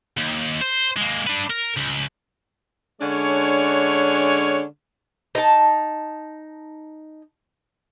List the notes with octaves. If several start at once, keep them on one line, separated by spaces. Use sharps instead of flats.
D#2
C5
G#3 A#3
D4 B4
A#4
C#2
D3 G#3 C#4 D4 C#5
D#4 A5